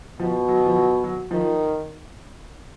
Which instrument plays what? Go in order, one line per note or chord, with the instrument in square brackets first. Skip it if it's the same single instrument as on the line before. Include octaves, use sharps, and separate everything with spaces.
[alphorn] B2 [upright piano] F3
[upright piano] F#3
F3
F#3
F#3
[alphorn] D#3 [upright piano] F3